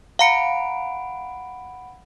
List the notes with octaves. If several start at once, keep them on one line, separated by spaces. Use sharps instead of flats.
F5 F#5 A#5 B5 C#7 D7